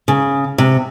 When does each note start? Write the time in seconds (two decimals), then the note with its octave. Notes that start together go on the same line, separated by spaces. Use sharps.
0.08 C#3
0.58 C3